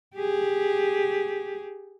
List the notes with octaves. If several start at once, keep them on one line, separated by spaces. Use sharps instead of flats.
G4 G#4